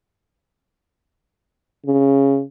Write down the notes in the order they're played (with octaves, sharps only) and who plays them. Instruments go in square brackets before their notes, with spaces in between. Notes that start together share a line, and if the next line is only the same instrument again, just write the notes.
[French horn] C#3